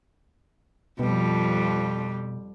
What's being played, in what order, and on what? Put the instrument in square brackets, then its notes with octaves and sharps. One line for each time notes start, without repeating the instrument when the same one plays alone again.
[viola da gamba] F2 F3 G3 [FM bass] B2